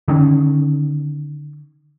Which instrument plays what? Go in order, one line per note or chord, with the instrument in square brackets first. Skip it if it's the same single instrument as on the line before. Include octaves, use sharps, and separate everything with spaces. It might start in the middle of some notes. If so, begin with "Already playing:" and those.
[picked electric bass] D3 D#3 A#3 C#4